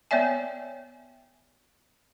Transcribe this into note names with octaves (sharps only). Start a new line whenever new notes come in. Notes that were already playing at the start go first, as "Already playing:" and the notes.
B3 C#5 D5 E5 G#5